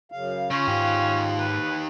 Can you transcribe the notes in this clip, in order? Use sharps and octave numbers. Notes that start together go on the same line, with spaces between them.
F#2 C#3 F5
C#3 C#4 F4
G#2 D#3 G4
B4